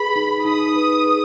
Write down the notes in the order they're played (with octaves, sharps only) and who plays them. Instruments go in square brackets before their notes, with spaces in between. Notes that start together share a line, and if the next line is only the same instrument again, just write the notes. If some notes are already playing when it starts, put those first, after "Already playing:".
Already playing: [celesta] G#4 B4 [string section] B5
[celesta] D#4
[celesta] D#4 [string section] D#6
[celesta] B4
G#4